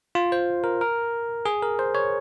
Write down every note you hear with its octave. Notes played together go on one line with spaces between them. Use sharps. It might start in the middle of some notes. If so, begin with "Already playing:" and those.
F4
C5
A#4
A#4
G#4
A#4
C5
C#5